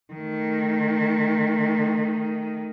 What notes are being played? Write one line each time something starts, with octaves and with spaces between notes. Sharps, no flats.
D#3 A3